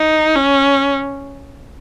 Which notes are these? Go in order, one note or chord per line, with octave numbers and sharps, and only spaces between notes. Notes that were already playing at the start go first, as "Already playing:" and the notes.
Already playing: D#4
C#4